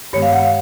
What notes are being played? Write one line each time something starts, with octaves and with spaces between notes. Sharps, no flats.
G2 D#3 G#3 B3 C#5
F5
F#5
F5